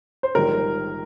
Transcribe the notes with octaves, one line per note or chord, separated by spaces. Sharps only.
C5
A#1 G#2 D#3 G3 A#4